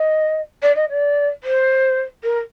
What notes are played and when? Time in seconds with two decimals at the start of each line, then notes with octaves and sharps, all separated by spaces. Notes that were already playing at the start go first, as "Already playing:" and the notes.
Already playing: D#5
0.62 D5
0.75 D#5
0.89 D5
1.44 C5
2.23 A#4